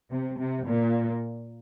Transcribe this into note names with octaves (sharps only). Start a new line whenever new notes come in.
C3
C3
A#2